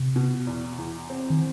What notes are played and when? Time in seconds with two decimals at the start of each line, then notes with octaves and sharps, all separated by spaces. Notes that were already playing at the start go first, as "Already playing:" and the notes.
Already playing: C3
0.16 B2
0.47 E2
0.78 E2
1.10 C4
1.30 D#3